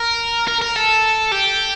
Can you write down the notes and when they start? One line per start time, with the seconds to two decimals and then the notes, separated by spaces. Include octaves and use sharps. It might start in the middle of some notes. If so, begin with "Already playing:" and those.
Already playing: A#4
0.48 A#4
0.62 A#4
0.76 A4
1.32 G4